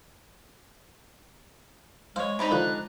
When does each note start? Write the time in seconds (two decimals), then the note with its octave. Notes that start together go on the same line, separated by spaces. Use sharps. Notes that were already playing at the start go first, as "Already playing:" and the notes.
2.16 G#3 C5 C#5 F5
2.39 C3 G#3 D4 D#4 B5
2.51 D3 F3 A#5 F#6